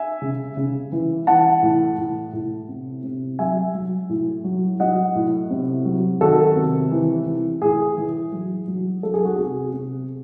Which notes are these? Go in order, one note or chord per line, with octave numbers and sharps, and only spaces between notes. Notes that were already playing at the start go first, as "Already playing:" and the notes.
Already playing: E5 G#5
C#3
C#3
E3
E3 F#5 A5
A2
A2
A2
C3
C3
F#3 E5 G#5
F#3
A2
F#3
F#3 D#5 F#5
A2
C3
F#3
D#3 F#4 A4
C3
E3
E3
A2 G#4
E3
F#3
F#3
F#3 A4
G#4
F#4
C3 G#4
C3